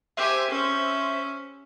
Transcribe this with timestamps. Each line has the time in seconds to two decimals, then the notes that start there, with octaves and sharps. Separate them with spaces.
0.17 G4 C5 E5 G#5
0.50 C#4